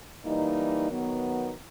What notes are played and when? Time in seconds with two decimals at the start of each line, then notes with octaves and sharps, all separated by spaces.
0.25 E3 G3 A#3 D#4
0.89 D#3 F#3 B3